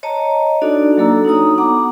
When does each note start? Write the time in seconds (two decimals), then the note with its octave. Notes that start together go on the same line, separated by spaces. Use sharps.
0.03 C#5 D#5 A5 A#5
0.62 D4 D#4 F#4 A4 D5
0.97 F#3 A#3 D4 A4 A#5 E6
1.25 D#4 F#4 C#5 A#5 D#6
1.58 B3 F#5 A#5 D6